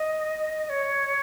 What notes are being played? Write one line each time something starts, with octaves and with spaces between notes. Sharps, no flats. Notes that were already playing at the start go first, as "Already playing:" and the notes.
Already playing: D#5
C#5